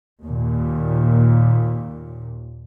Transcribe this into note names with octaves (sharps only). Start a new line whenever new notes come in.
D#2 A#2